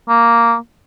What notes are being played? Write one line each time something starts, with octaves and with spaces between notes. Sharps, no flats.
A#3